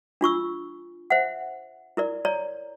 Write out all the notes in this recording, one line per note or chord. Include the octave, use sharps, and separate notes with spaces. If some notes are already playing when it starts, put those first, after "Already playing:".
D4 F4 C#6 E6
C5 E5 F#5
E4 A#4 D5
C#5 D5 A#5